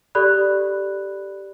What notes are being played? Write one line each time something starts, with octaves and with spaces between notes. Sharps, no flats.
G4 A4 D5 B5 F#6